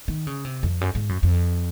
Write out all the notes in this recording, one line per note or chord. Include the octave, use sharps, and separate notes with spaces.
D#3
C#3
C3
F2
F#2
G#2
F#2
F2